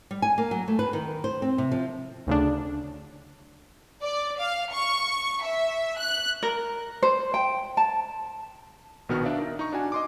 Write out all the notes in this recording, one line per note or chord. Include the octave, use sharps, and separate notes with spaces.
G3
G#5
A#3
F#3
A3
B4
D#3
C5
C4
C3
F3
D2 C#3 D4
D5
F5
C#6
E5
F#6
A#4
C5
G5
A5
A#1 B2 D#3 B3 F#4 F6
D4 D5 E5 F5
D#4 A#4
D#4 C#6
D4 F#4 G#5
D#5 C6 D6